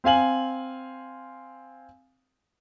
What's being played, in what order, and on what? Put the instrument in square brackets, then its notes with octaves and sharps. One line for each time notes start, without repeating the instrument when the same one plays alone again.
[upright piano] C4 F5 G#5 F#7